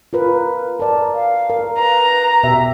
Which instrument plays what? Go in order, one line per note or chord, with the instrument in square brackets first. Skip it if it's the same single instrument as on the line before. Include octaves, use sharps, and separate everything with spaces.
[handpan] F4 A#4 B4
[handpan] A#4 D5 [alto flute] A5
[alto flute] F5
[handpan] A#4
[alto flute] B4 [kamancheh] A#5
[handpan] B2 G4 E5